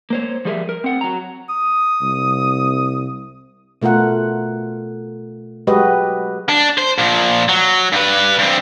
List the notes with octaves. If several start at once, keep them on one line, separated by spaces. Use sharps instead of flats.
A#3 C5 C#5
F3 G3 G#4 A#4 E5
A#4
C4 F#5
F#3 A#5
D#6
C2
B2 A3 F4 A#4 F#5
F#3 G#3 F#4 G4 B4 D#5
D4
C5
A#2 F3
F#3
G2 B4
G2 C4